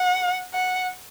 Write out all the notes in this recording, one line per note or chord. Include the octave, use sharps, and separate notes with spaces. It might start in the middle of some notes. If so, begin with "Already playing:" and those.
Already playing: F#5
F#5